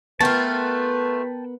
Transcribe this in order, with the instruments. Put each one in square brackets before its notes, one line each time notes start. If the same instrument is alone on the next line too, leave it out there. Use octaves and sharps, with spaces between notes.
[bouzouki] A3 F4 [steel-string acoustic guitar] B3 A#4 [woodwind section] B4 [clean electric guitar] G5 A5